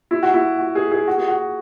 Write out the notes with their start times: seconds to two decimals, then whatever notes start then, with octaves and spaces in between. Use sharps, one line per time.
0.11 E4
0.23 F#4
0.34 E4
0.59 F#4
0.75 G#4
0.91 G#4
1.07 F#4
1.18 G#4
1.28 F#4